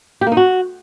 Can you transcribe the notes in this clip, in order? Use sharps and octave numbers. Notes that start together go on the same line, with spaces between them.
G4
A#3
D#4
F#4